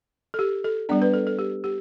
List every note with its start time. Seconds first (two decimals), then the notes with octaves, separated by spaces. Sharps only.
0.34 A4
0.39 G4
0.64 A4
0.89 G3 B3 D4 D5
1.02 B4
1.14 A4
1.27 A4
1.39 G4
1.64 G4